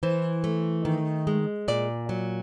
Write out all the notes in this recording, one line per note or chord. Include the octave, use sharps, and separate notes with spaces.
E3 C5
A3
D#3
G#3
A#2 D5
F#3